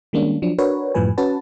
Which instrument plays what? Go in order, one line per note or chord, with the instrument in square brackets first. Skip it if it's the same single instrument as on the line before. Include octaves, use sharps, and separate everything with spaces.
[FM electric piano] D#3 G3 G#3 A#3 C#4 D4
F3 F#3 D4
D4 F#4 A#4 B4 C#5
F#2 A2 F3 G3 B4 G#5
C#4 F#4 B4 A5